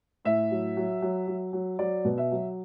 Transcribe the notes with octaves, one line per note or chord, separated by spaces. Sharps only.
A2 E5
F#3
F#3
F#3
F#3
F#3
F#3 D5
B2
E5
F#3